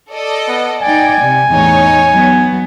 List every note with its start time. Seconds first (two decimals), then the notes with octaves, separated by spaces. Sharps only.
0.12 A4 D5 D#5
0.48 B3
0.82 D#4 D5 G5 G#5
1.21 C3
1.51 E2 A2 D#4 C#5
2.12 F#3 B3